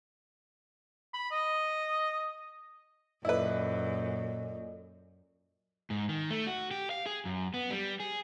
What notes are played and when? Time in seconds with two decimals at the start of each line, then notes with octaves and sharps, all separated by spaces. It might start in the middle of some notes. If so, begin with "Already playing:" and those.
1.14 B5
1.31 D#5
3.25 F#2 A#2 E4 A4 B4 D5 D#5
5.90 G#2
6.09 D#3
6.30 A3
6.47 F#4
6.71 G4
6.91 F5
7.06 G#4
7.25 F#2
7.54 B3
7.71 G3
8.00 G#4